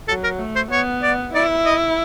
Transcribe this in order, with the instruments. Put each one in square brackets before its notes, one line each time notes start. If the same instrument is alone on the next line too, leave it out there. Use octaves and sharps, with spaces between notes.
[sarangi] F#3 [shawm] A4
[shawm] A#4
[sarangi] A3
[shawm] C5
[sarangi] B3 [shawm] C#5
[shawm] D5
[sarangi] E4 [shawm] D5
[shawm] D#5